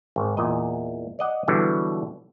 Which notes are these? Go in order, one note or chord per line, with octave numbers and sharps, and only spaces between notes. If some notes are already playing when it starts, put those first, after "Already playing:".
G#1
E2 A#2 D#5
D5 D#5 F#5
B2 D3 E3 F#3 G3